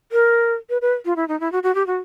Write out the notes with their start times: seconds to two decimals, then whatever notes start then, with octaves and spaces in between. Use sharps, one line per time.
0.12 A#4
0.70 B4
0.82 B4
1.05 F4
1.16 E4
1.28 D#4
1.40 E4
1.52 F#4
1.63 F#4
1.75 G4
1.87 F#4